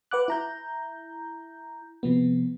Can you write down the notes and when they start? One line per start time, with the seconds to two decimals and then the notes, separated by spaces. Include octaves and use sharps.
0.11 B4 F#5 D6 F#6
0.28 E4 A#5 G6
2.03 C3 F3 B3